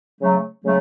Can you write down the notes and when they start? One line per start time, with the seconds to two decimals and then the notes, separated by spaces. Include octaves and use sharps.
0.21 C#3 F#3 A3
0.64 C#3 F#3 A3